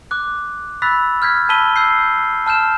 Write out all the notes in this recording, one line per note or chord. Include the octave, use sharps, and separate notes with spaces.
D6 F#6
B5 E6 F#6 A6 B6
F6 G6 G#6 B6
A5 B5 E6 B6 D#7 G7
E6 G6 C7
A5 F6 G6 E7